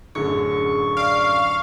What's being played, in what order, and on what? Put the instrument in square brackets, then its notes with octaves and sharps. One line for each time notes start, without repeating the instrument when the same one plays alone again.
[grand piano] A1 F#2 D3 [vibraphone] G#4 [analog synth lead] C#6
[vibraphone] D5 [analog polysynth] F5